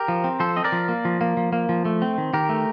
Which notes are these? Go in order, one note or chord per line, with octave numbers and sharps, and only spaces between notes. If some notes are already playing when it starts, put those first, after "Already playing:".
Already playing: G4 A#4
F3
C4
F3 A4 C5
C4 D#5
A#4 D5
F3
A#3
F3
A#3
F3
A#3
F3
A3
C4
D#3
D#3 G4 A#4
A3